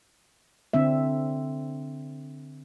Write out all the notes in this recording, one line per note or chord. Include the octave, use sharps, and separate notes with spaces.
D3 C4 D4 E5